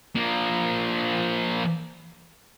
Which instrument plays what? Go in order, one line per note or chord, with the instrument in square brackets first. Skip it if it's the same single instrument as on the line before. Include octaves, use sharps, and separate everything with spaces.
[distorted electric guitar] F3 A#3